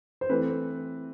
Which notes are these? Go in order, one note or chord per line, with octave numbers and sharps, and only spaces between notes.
C5
E3 A3 C4 B4